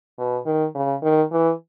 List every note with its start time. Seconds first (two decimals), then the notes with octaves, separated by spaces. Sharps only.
0.18 B2
0.46 D#3
0.75 C#3
1.02 D#3
1.32 E3